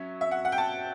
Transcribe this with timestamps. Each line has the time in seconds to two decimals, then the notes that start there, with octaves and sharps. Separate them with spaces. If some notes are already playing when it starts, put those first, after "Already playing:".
Already playing: F#3 C#4 E5
0.21 E5
0.31 F#5
0.45 F#5
0.52 G5
0.58 A5